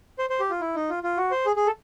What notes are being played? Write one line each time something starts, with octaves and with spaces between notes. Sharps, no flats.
C5
C5
G4
F4
E4
D#4
F4
F4
F#4
C5
G#4
G#4
A4